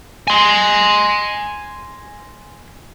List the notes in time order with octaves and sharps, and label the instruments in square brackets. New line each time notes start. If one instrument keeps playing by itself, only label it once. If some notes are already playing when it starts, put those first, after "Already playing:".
[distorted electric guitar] G#5 C6